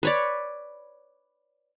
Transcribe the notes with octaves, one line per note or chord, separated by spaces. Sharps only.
B4 C#5 D5